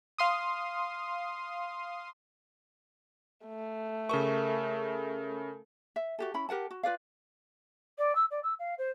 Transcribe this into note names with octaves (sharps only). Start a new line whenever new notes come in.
F5 C6 D#6
A3
C#3 A4 A#4 C#6
E5
F#4 G4 A4
C#4 E4 B5
G4 A#4 F#5 A5
F#4
F4 B4 D5 F5
D5
E6
D5
E6
F5
C5